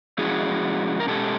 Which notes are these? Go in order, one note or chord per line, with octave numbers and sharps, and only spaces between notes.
F3 G#3 C#4 E4 F#4 G#4
A#4
B2 G#3 C#4 G4 A4